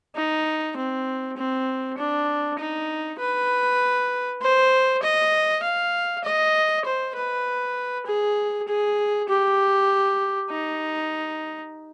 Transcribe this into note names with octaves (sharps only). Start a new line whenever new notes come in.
D#4
C4
C4
D4
D#4
B4
C5
D#5
F5
D#5
C5
B4
G#4
G#4
G4
D#4